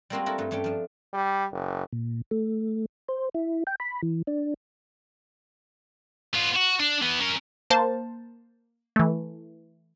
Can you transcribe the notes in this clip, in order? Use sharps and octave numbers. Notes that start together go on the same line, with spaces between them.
G3 G#3 A#3 C4 F4 F#4
D4 E4 F#4 A4 A#4
G2 A3
G2 A3 C#4 D4 G4 G5
F3 D4
G3
F#1
A#2
A3
C5
E4
G5
B5
E3
D4
B3 F4
F#4
D4
E3 B3
C#4 A#4
A#3 C5 A5
E3 A3